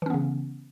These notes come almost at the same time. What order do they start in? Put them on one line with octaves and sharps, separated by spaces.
E3 C#4 B3 C#3